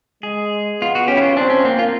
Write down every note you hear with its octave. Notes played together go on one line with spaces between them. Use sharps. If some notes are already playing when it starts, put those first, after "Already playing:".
G#3 G#4
B3 F4
F#4
C#4 G4
E4
F4
C4 D4
C#4
A#3 C4
F4